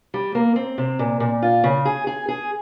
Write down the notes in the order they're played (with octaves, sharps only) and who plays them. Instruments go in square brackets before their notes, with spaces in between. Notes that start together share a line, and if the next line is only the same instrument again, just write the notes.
[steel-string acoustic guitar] G3
A#3
C4
C3
A#2
A#2
F4
C#3
G#4
G#4
G#4